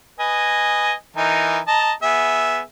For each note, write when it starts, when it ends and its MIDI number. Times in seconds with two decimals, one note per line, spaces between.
0.20 0.93 71
0.20 0.93 75
0.20 0.93 80
1.17 1.58 52
1.17 1.58 63
1.17 1.58 70
1.68 1.92 75
1.68 1.92 81
1.68 1.92 82
2.03 2.60 59
2.03 2.60 68
2.03 2.60 76